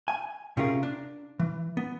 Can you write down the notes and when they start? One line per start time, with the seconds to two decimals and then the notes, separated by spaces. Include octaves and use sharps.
0.08 G#5
0.57 C3 C#4 F4 G#4 A#4
0.83 D4
1.40 E3
1.77 B3